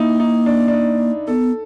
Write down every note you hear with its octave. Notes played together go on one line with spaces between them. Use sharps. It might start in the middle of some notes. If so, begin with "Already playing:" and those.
Already playing: A#3 D#4 E4
D#4
D4
D4
D#4
B3 A4